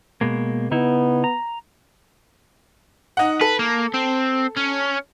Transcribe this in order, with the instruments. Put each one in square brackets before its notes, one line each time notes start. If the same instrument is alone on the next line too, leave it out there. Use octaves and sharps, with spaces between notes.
[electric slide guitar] B2 G#3 A#3
[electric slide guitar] C#3 D#4 E4 [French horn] B3
[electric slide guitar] A#5
[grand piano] D#4 F#5
[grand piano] A4 [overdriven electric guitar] B4
[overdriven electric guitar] A#3
C4
C#4